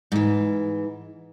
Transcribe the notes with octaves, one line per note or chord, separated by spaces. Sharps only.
G#2 E3